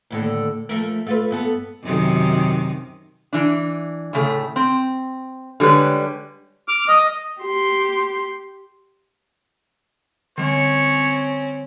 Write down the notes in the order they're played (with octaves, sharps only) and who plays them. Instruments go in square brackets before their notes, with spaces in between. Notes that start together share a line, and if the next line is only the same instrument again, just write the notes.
[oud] D#2 A2 D3
F3 A3 A#4
A3 F4 B4
G2 B3 A4
[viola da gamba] F#2 C3 D#3
[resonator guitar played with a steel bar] E3 D4
A2 C#3 A3
C4
D3 G3 G#3 B4 C#5
[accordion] D6 F6
[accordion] D#5 [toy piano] D#6
[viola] G4 C6
[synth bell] D3 G3 [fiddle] C4 C#4 [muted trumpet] C#5